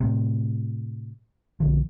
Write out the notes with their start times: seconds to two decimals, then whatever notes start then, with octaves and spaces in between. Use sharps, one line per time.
0.01 A2 C3
1.60 B1 D3 F3